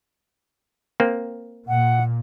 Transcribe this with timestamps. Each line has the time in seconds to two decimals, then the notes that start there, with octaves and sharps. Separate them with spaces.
1.00 A#3 C4
1.68 A#2 F#5